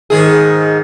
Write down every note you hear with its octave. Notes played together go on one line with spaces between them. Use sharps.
G#2 D#3 G#4